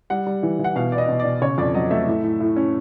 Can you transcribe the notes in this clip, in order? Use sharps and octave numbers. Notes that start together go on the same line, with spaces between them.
G3 F#5
G3
E3
E3
F#5
B2 F5
B3 D5
D#5
B2
D5
B2
C#3 C#5
F2 D5
F#3 D#5
A3 E5
A2
A2
A2
C#4